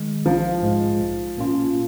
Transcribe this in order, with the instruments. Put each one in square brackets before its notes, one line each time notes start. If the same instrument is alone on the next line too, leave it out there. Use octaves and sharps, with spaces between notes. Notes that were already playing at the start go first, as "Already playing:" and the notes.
Already playing: [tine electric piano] D#3 G#3
[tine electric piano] A#1 [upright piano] F3
[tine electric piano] G#2 G#3
A#1
A#2 A#3 C#4 F4